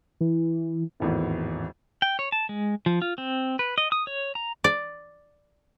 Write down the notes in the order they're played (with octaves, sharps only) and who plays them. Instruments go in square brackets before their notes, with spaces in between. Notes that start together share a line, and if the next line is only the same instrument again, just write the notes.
[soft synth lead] E3
[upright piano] G#1 E2 A2
[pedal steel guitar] G5
C#5
A5
G#3
F3
F4
C4
B4
D#5
D#6
C#5
A#5
[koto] D5